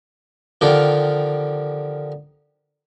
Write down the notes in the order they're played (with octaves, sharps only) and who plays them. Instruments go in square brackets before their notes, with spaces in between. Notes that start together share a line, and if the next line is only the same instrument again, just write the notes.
[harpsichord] D3 D#3 F3 G4